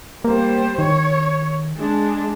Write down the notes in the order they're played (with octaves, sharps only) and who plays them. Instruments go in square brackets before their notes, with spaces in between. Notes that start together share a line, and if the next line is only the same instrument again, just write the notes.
[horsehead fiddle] G3 C5 [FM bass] A#3
[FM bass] D#3 [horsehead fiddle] C#5
[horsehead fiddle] G#3 D4